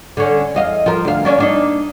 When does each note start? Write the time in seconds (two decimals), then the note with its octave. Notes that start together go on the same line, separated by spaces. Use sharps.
0.17 D3 C#4
0.55 E2 D#5 F5
0.86 F3 A#4
1.05 D2 F5
1.25 A#3 C#4 D4
1.38 A#3 D4 D#4